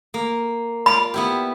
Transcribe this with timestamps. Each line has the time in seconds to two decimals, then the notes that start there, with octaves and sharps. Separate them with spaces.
0.14 A#3
0.86 F4 D5 B5
1.14 B3 E4 G4